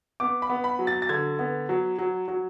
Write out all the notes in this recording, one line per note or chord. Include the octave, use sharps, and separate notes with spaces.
B3 D6
B5
B3
B5
F#3
A6
A6
D3 G#6
B3
F#3
F#3
F#3